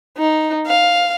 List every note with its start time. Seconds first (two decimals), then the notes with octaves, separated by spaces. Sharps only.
0.18 D#4
0.67 F5